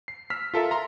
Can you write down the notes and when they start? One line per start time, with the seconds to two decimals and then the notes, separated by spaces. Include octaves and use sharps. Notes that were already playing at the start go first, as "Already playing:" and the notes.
0.08 C7
0.30 E6 F6 B6
0.54 F4 A4 A#4 E5
0.71 A#5 C6